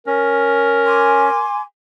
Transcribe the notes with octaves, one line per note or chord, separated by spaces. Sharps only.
C#4 A#4
G#5 C6 D6